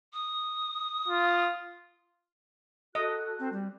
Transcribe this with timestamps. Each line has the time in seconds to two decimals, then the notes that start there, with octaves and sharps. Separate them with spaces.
0.13 D#6
1.08 F4
2.95 F#4 A4 D#5 F#6
3.39 C4
3.53 G3